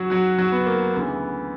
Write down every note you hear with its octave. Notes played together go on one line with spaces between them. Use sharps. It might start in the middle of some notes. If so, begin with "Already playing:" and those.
Already playing: F#2 F#3 F#4
F#3 F#4
F#3 F#4
B3
A#3
D2 C#3 E3 B3